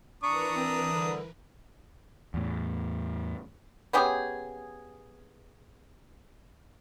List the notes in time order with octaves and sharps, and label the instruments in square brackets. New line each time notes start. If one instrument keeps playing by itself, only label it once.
[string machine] E3 A#4 B4 [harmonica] D4 A#5 D#6 [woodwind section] C#6
[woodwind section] C4
D3 G3
[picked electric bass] E2 A2
[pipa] B3 C#4 G4 G#4